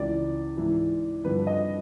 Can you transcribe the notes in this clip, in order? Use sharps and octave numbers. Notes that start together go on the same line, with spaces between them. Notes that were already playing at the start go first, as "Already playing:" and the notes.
Already playing: C#2 C#3 E3 D5
G#2 E3
G2 D3 F3 B4
D#5